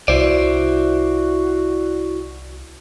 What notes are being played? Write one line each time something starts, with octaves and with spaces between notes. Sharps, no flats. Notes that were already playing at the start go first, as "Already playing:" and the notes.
C2 E4 F#4 C5 D5